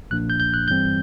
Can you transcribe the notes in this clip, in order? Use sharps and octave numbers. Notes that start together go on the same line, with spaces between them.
B1 A#2 F3 A#3 D4 F#6
G6
G6
F#6
G2 E3 G3 C4 G6